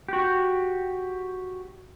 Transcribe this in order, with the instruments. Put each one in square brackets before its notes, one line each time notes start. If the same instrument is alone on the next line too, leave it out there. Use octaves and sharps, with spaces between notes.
[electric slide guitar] F#4 G4